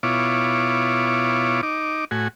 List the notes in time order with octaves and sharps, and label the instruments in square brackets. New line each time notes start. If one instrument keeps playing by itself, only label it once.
[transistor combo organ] B2 E4 F4 C#5 D6
D#4 D6
A2 F#4 G#5